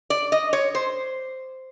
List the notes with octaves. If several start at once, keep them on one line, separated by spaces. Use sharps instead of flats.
D5
D#5
C#5
C5